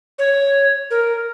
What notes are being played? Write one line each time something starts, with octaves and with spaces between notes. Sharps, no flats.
C#5
A#4